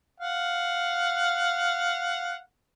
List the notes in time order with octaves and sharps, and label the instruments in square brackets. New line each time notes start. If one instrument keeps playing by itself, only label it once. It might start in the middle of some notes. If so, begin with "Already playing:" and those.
[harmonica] F5 F#5